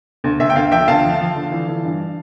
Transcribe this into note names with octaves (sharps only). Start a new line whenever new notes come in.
D2
D2 E5
G5
D2 F5
F3 E5 G5
D2 F5 A5
F3
F3
D3
E3
E3
G2